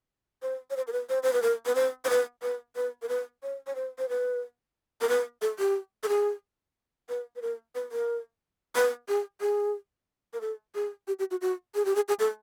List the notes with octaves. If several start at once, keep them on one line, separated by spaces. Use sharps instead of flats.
C5
C#5
C5
A#4
B4
C5
C5
B4
A#4
B4
C5
C5
B4
B4
B4
A#4
B4
C#5
C#5
C5
C5
B4
A#4
B4
A4
G4
A4
G#4
B4
B4
A#4
B4
A#4
B4
G#4
G#4
A#4
A4
G#4
G4
G4
F#4
F#4
G#4
G4
G#4
G#4
A4